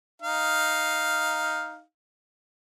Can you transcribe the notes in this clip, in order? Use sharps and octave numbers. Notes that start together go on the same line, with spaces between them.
D#4 F5